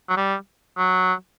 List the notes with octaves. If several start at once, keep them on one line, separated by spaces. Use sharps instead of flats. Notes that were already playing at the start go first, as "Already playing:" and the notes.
F#3
G3
F#3